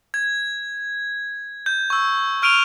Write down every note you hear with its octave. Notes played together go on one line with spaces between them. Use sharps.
G#6
G6
C#6 E6
C#6 F6 D7 D#7 F7 G7